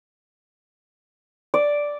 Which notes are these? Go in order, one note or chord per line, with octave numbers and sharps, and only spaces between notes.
D5